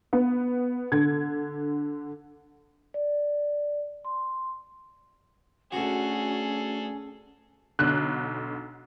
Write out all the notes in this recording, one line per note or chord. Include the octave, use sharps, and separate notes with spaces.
B3
D3 G#6
D5
C6
D2 C#4 F#4 G#4 A4
B1 D3 F#6